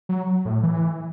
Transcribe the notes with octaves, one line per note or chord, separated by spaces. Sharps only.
F#3
A2
E3